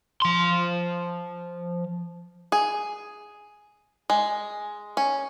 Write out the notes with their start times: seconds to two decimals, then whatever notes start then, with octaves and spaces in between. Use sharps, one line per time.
0.22 F3 C6
2.52 G#4
4.10 G#3
4.97 C#4